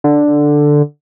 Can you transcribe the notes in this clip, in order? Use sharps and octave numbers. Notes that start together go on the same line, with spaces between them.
D3